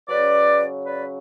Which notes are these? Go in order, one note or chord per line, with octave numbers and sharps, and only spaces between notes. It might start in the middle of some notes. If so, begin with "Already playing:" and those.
C#3 F#3 C#4 B4 D5
B4 D5